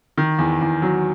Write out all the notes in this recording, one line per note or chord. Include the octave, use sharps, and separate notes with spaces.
D#3
E2
E2
F#3